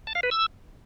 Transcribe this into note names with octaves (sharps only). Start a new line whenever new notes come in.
A5
F5
B4
E6